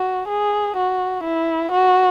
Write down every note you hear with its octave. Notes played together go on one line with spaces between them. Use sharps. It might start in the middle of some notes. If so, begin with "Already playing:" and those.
Already playing: F#4
G#4
F#4
E4
F#4